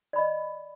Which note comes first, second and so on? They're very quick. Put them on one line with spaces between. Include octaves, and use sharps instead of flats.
D5 B5 D#5